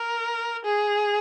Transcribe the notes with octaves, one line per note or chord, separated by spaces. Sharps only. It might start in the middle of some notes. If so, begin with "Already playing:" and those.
Already playing: A#4
G#4